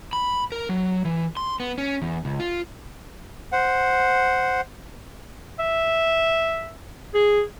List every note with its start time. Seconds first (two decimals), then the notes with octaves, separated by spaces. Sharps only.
0.13 B5
0.52 A#4
0.69 F#3
1.05 E3
1.37 C6
1.60 B3
1.78 C#4
2.02 E2
2.25 C#2
2.40 F4
3.52 C5 F#5
5.59 E5
7.14 G#4